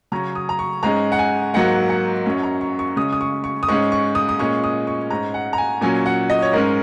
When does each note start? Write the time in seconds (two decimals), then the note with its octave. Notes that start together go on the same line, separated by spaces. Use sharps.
0.12 C#3 F#3 C#4 A#5
0.35 D#6
0.49 A#5
0.59 C#6
0.83 G#2 G#3 C#4 A#5
1.12 F#5
1.19 G#5
1.54 G#2 F#3 A#3 F#5
1.89 F#5
2.26 F#2 F#3 C#4
2.43 A#5
2.61 C#6
2.79 C#6
2.96 C#3 G#3 C#4 D#6
3.13 D#6
3.21 C#6
3.44 C#6
3.63 D#6
3.68 G#2 G#3 C#4 C#6
3.92 C#6
4.15 D#6
4.29 D#6
4.39 A#2 G#3 C#4 C#6
4.64 D#6
4.87 C#6
5.10 G#2 G#3 C#4 A#5
5.34 F#5
5.53 A#5
5.58 G#5
5.81 A#2 F#3 C#4 G#5
6.06 F#5
6.30 D#5
6.42 C#5
6.53 G#2 G#3 C#4 A#4